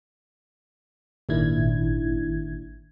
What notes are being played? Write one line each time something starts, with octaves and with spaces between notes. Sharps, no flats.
G#1 A#2 D#3 D4 E4 G#6